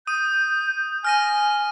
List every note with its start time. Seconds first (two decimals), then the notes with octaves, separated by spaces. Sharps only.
0.07 D#6 G6 D#7
1.05 G#5 F6 A#6 D#7